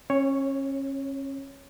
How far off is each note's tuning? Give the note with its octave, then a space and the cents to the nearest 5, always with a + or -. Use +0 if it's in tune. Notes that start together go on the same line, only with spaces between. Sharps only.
C#4 -30 C#5 +0